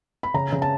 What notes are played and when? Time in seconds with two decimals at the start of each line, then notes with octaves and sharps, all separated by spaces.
0.23 B5
0.34 C#3 A#5
0.52 C#3
0.62 A5